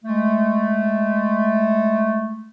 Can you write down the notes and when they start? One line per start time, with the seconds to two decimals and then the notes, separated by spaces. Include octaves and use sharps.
0.05 G#3 A3